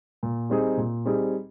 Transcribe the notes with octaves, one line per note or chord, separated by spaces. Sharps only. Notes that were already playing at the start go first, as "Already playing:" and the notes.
A#2
G3 C4 D#4 G#4
A#2
G3 C4 D#4 G#4